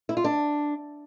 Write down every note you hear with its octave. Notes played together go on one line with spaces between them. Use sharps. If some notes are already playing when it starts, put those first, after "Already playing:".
E4
F4
D4